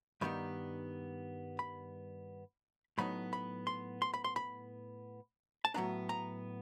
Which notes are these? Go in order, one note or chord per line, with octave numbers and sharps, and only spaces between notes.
G2 D#3 G3 B3 D#4 B5
B5
A2 F#3 B3 D#4 B5
B5
C6
C6
B5
C6
B5
A5
A2 F#3 B3 D4 A#5
A#5